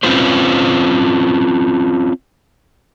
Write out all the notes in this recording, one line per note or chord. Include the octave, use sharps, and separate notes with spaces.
C4 C#4 F4 B4 C5